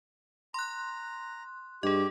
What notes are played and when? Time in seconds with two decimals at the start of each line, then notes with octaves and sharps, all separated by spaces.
0.54 A#5 C6 F#6
1.83 G2 G4 G#4 D#5